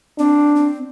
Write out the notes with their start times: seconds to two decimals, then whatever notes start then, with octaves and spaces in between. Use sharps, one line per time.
0.19 C4 D4
0.56 C4